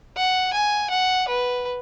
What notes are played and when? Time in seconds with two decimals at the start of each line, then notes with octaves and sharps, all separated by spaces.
0.17 F#5
0.53 G#5
0.90 F#5
1.28 B4